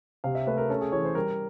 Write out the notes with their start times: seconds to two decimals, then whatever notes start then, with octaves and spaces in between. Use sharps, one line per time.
0.24 C3 F5
0.35 E5
0.47 A3 B4
0.58 A#4
0.69 C#4 A4
0.81 G#4
0.92 E3 C#5
1.05 C5
1.15 G3 A#4